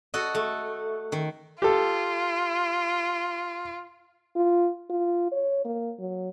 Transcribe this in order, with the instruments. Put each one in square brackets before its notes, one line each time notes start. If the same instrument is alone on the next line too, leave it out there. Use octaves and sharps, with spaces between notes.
[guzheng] F#4 A4 D#5
A3
D#3
[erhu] F4 [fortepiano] G4 A4
[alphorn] F4
F4
C#5
A#3
F#3